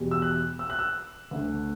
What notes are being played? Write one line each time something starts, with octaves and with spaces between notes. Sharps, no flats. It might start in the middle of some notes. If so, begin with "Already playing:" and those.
Already playing: E2 B2 G3
E6
F#6
E6
F#6
E6
D2 D3 A3